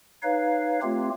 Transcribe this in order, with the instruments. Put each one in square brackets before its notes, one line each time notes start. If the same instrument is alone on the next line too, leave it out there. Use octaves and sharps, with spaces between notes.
[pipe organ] D#4 B4 C#5 F5
A3 C4 F4 G4